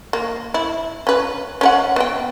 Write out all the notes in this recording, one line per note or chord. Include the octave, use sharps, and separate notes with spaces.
A#3
E4
C#4 B4
C#4 A#4 F#5
B3 G5